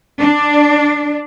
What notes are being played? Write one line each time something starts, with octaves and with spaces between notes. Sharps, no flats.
D4